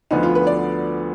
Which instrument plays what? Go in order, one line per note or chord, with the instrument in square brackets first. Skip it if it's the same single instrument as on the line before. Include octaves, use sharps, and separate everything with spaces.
[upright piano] D2 D3 F3 B3 [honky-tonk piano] D#4
[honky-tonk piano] F4
B4
D5